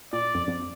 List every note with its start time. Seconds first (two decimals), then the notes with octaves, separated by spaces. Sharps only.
0.13 A#2 D5
0.35 F2
0.48 F2